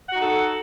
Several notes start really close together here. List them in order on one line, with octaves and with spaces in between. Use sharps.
F#5 F#4 D#4 A4